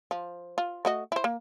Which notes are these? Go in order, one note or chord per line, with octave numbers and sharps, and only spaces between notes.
F3
F4
A3 F#4 D#5
E4 C5
A#3